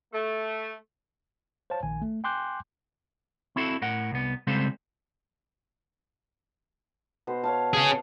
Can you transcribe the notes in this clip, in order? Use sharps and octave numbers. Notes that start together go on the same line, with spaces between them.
A3
C5 C#5 F5 A5
A#1 D#3 G#5
A3
G5 G#5 C6 D6 F#6 G6
C4 E4 F#4 A4
A2 A#4 F#5
C2 B3
C#3 G3 G#3 C4 A4 C5
B2 B4 C5
C#5 F5 A5
C#4 G#4